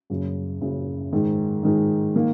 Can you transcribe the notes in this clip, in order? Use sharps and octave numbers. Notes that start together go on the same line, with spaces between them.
F#1 F#2 C#3
F#1 F#2 C#3
G#2 D#3 G#3
G#2 D#3 G#3
D#3 A#3